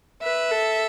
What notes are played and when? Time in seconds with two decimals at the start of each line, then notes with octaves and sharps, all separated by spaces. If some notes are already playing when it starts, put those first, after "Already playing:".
0.23 B4 E5
0.51 A4